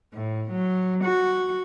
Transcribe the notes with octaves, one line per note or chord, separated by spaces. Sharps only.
A2
F#3
F#4